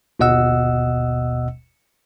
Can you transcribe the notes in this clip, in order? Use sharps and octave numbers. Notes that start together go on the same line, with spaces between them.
G1 D#2 B2 D#5 F#5 E6